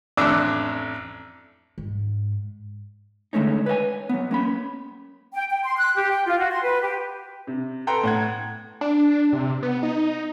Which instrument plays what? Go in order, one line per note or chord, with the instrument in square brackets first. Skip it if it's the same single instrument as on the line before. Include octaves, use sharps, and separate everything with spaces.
[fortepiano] A1 F2 D4 D6 E6
[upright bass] G#2
[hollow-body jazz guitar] D3 G#3 A3 C#4 D#4
B4 C#5 D#5 G#5
F#3 B3
A#3 C#4 B5
[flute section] G5
G5
C6
F#6
G4
G5
F4
F#4
C6
B4
G4
[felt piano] C3
A4 B4 G5 A#5 C6
A2 F#5 G#6
[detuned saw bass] D4
C3
B3
D#4